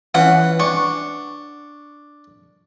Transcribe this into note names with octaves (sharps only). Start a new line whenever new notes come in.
E3 C#4 F#5
D4 C#6